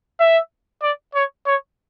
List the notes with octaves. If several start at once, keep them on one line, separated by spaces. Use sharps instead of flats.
E5
D5
C#5
C#5